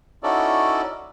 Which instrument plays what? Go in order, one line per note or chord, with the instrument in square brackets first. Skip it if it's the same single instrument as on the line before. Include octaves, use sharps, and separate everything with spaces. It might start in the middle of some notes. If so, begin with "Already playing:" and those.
[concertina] C#4 D#4 E4 F#4 A4 D5